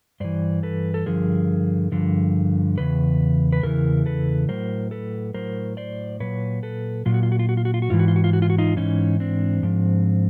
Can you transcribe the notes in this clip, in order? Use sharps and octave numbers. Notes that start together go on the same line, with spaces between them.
G2 E3 C5 D5
A4 B4
A4
G2 D3 F3 G#4 A#4
G2 D3 F3
E2 C#3 B4
B4
E2 C#3 E3 A#4
A4 B4
A2 F#3 A#4 C5
A4 B4
A2 F#3 A#4 C5
C5 D5
A#2 F#3 B4 C#5
A4 B4
A#2 F#3 F4
F#4
F4
F#4
F4
F#4
F4
F#4
F4
F#4
G#2 E3 F4
F#4
F4
F#4
F4
F#4
F4
F#4
D#4 F4
G#2 E3 C#4 D#4
C4 D4
G#2 F3